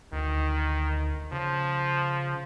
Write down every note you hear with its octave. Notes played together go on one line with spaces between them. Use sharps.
D2 D#3
C#3 F3